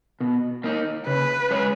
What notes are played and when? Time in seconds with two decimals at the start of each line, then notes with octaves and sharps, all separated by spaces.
0.20 B2
0.64 A#3 D#4
1.07 C#3 B4
1.51 G#3 C#4 G#4 C#5